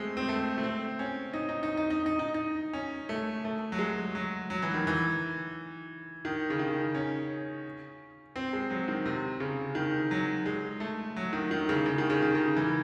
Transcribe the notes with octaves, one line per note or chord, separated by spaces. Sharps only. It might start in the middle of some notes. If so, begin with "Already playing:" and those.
Already playing: G#3 A3 C4
C4
A3
A3
C4
C#4
D#4
D#4
D#4
D#4
D#4
D#4
D#4
D#4
C#4
A3
A3
F#3
G#3
F#3
F#3
E3
D#3
E3
D#3
C#3
D#3
C#4
C4
G#3
F#3
D#3
C3
C#3
D#3
F#3
G#3
A3
F#3
D#3
D#3
C#3
C#3
D#3
C#3
D#3
C#3
E3